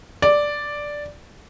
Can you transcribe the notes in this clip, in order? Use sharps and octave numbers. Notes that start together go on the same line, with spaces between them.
D5